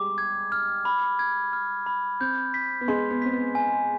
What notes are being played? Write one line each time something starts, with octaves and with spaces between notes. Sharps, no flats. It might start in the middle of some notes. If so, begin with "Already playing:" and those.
Already playing: G3 G#3 D6
G#6
F6
B5
G#6
F6
B5
C4 G6
B6
B3
G#3 C6
B3
C4 B6
B3
G#5